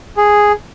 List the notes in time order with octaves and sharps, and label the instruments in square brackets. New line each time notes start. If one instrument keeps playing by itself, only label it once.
[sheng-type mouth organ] G#4